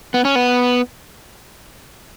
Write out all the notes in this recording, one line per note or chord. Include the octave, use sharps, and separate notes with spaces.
B3
C#4
B3